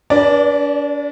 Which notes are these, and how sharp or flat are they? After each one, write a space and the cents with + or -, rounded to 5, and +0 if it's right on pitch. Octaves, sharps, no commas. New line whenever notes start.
D4 -40 B4 -35 D5 +0